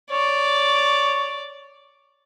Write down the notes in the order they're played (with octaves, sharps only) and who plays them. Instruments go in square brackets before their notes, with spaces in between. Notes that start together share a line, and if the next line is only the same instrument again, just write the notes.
[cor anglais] C#5 [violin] D5